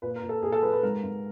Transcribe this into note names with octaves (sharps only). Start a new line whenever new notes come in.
A#2 B4
A#4
A#2
A4
A#2 G#4
A4
F3 B4
B4
G#2 A#4
G#2